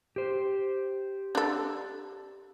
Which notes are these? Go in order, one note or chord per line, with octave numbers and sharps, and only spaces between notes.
G4 C5
D4 A4